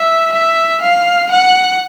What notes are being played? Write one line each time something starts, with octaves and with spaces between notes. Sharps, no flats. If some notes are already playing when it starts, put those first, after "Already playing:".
Already playing: E5
E5
F5
F#5